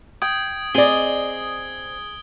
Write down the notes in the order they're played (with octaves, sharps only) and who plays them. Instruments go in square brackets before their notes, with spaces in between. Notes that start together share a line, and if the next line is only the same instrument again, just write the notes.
[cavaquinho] G5 [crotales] D#6 G#6 D7
[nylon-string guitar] C4 D5 [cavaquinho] G#4 D#5 [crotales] G#6 G7